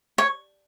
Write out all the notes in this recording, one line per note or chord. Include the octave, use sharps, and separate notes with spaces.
C#5